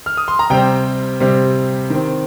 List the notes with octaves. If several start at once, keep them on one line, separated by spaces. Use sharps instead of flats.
F6
D#6
C6
A#5
C3 G3 C4 G5
C3 G3 C4
D#3 C4